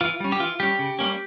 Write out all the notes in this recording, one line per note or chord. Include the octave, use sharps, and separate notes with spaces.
E3 F4
G3 C#4
G4
E3 F4
G3 C#4 G4
C#3
G3 A#3 C#4